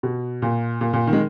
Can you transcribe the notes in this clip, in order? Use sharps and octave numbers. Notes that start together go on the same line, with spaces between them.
B2
A#2
A#2
A#2
D#3
G#3